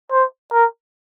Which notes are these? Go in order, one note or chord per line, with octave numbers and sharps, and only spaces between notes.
C5
A#4